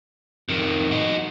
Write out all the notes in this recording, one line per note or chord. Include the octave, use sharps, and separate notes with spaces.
F2 D#3
D#4 F#4